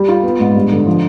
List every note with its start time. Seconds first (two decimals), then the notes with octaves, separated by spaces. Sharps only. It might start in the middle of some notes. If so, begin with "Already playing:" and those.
Already playing: G3
0.09 F4
0.23 B3
0.40 G#2
0.55 G2
0.71 D3
0.86 F3